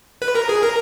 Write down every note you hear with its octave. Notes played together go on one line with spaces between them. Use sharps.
B4
A#4
G#4
A#4